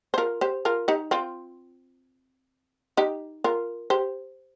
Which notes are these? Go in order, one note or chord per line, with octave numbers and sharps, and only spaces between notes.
C5
F4 A#4
G4 C5
F4 A#4
D#4 G4
C4 F4
D#4 G4
F4 A#4
G4 C5